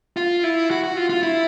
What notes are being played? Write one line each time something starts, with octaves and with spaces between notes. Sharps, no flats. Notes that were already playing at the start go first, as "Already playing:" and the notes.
F4
E4
F#4
F#4
F4
F4
E4